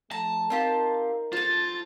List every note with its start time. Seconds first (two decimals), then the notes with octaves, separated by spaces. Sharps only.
0.11 F3 A3 A5 A#5
0.50 C4 D#4 F4 G4 A#4
1.33 F4 A4 C5 A6